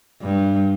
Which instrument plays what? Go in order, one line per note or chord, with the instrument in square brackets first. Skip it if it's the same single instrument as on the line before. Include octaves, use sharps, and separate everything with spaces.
[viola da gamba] G2